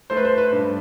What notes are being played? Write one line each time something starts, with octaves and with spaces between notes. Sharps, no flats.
A3 C5
B4
C5
B4
G2